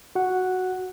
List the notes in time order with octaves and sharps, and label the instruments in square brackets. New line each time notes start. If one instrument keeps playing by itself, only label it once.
[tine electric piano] F#4 F#5